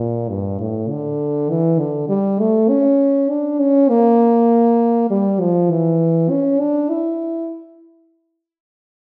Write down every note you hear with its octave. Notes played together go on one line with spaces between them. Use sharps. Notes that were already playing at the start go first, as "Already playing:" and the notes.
Already playing: A#2
G2
A2
D3
E3
D3
G3
A3
C#4
D4
C#4
A#3
G3
F3
E3
C#4
D4
E4